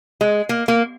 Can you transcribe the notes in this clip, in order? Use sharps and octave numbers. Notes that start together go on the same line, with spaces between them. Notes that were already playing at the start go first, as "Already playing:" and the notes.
G#3
A#3
A#3